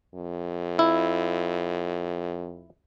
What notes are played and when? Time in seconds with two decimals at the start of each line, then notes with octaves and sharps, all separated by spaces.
0.14 F2
0.79 E4